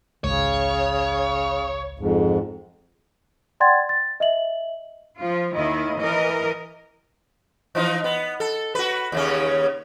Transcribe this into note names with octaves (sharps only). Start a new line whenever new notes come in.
G#1 C#2 C#3 C#5
F2 G#2
D5 F#5 G5 C6 G#6 A6
A6
D#5 E5 F#7
F3 F4
D#2 D#3 E4 D#5
E3 A#4 D#5
E3 F3 D#4
B3
A4
F#4 B4
D#2 C#3 C#4